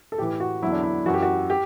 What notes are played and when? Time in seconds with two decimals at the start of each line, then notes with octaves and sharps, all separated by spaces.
0.12 A4
0.18 A2 E3 G4
0.40 F#4
0.62 E2 D3 F#3 E4
0.73 D4
0.83 E4
1.05 F#2 E3 F#4
1.14 G4
1.22 F#4
1.50 G4